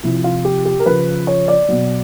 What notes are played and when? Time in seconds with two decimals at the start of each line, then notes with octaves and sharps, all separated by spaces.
0.03 C3 F3 E4
0.24 F4
0.45 G4
0.65 G4
0.80 A#4
0.86 C#3 F3 B4
1.27 C#5
1.48 D5
1.69 B2 F#3